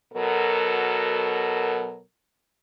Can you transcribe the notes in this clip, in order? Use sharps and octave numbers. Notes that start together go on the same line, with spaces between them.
B2 F#3 A4 A#4